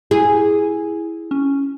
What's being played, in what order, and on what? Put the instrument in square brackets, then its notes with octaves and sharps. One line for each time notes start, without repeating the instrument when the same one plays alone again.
[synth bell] E4 [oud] G#4
[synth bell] C#4